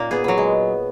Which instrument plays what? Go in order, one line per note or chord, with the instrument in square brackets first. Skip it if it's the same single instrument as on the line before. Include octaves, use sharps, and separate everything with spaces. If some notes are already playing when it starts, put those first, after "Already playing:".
Already playing: [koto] A#2 A#3 [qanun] C#4 D#4
[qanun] B3 [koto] G#4
[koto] F#3 [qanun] B3
[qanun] G#3